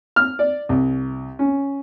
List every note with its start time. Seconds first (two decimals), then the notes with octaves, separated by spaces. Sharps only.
0.16 F6
0.39 D5
0.69 C2
1.39 C#4